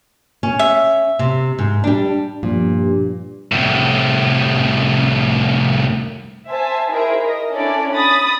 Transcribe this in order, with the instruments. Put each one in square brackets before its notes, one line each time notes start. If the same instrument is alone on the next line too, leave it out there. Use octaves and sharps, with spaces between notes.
[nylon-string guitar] C#4
[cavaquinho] E5
[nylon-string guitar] C3
G#2
G3 D4
[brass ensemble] G2 [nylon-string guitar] A#2 [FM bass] F3
[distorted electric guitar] C2 A2
[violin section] C5 E5 G#5 A5
D#4 E4 G#4 A#4 C5 E5
A#4 D#5
C#4 D4 E4 A4 D5
B5 D#6 A6